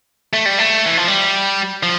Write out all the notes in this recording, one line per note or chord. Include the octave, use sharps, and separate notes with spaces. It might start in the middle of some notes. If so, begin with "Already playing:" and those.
A3
G3
A3
E3
F3
G3
F3